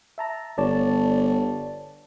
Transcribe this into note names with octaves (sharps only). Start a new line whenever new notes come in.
E5 A5 A#5
G1 C#5 D5 A5